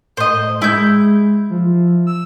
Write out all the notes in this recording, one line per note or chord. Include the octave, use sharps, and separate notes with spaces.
A2 C5 D#5
G#3 E4 G6
F3
E6